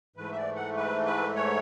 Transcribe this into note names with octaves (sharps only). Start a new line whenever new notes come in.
G#2 E3 A3 B4
E5
D5
F#5
B4
B4
C#5